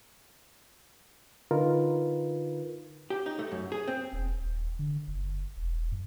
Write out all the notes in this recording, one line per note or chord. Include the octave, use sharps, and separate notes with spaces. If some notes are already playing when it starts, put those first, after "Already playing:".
D3 D#4 F4 A#4 B4
G4
D#4
A3
F#2
G#4
C4
E1
D#1
D3
F#1
E1
F#2